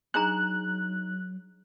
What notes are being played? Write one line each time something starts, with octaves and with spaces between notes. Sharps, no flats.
F#3 D4 D#4 G#4 A#5 F#6